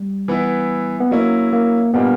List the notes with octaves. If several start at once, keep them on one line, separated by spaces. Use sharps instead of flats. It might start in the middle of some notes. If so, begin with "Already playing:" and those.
Already playing: G3
E3 B3 E4
B3
F#3 A#3 C#4 E4
A#3
A#2 G3 A#3 B3 D4